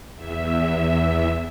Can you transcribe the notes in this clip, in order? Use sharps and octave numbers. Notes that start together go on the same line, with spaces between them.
E2 E5